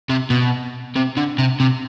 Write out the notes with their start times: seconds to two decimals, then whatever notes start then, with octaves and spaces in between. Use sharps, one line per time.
0.10 C3
0.30 B2
0.96 C3
1.17 D3
1.38 C3
1.60 C3